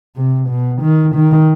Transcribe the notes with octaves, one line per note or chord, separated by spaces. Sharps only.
C3
B2
D#3
D#3